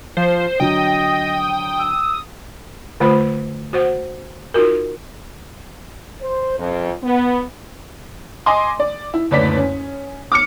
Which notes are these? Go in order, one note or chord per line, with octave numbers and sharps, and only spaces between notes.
F3 C5
D3 F#3 D#5 G5 D#6
E6
D3 A3 F4 C5 B5
F#4 C5 F#5
D#4 F4 F#4 A#4
C5
F2
B3
D#5 G#5 C6 D6
D5
E4
F#1 D2 B4 C#5 D5 B6
C#4
D6 F6 C#7